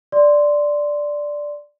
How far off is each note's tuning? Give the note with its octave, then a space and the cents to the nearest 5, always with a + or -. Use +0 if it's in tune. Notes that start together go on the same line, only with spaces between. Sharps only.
D5 +0 C6 -5